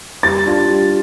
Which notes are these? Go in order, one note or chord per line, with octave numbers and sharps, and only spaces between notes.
G3 A6
D4 F4
G3